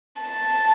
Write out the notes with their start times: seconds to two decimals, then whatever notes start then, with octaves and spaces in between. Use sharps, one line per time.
0.22 A5